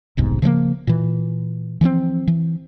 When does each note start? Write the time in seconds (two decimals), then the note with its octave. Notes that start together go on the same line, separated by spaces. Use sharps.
0.17 D#1 B1 G#2 C3
0.42 C#3 F3 G#3 A#3
0.87 A#2 E3
1.81 E3 F3 G#3 C4
2.28 E3